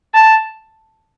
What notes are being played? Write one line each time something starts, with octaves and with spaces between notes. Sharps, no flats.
A5